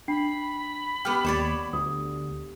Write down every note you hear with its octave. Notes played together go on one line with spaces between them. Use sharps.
D4 G5 B5 C7
B3 G4 G5 F6
D#2 G4 C#5 D5 E7
D2 D#6